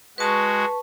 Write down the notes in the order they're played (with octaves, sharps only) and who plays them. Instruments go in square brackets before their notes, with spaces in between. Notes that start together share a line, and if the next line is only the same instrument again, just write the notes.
[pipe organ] G#3 F#4 [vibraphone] B4 A5 C#6